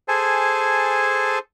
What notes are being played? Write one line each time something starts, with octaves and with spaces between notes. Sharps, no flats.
G#4 A4 C5 G#5 A5